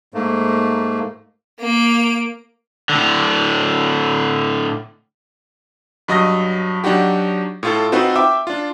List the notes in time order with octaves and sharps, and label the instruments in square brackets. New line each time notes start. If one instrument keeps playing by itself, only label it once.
[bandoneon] G#2 A3 A#3
[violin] A#3 D7
[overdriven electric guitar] A2 D3
[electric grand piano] G2 F#3 D#5 D#6 A#6
F#3 D4 D#4 F#4 G4
A2 F4 A4
C4 D#4 F4 F#4 B4
E5 G5 D6 E6
D4 F4